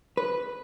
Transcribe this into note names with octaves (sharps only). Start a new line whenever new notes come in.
B4